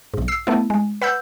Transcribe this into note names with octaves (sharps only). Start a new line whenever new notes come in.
B1 G#2
E6 C7
A3 B3 E4
G#3
B4 F#5 E6 G6